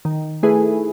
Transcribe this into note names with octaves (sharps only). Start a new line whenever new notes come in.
D#3
A3 E4 G#4 B4